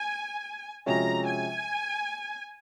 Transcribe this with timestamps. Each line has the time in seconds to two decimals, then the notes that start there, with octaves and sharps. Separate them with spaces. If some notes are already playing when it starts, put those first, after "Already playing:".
Already playing: G#5
0.86 C3 F3 G#3 C#4 F#4 A#5
1.27 G#5